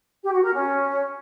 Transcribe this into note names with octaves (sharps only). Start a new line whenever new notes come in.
G4
F#4
A#4
C#4